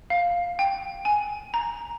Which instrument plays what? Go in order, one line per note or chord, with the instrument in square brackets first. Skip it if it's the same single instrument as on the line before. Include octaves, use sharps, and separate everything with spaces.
[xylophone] F5
G5
G#5
A#5